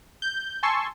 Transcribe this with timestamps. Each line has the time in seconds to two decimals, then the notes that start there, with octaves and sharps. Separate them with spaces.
0.22 G6
0.63 G#5 A5 C6 C#6 E6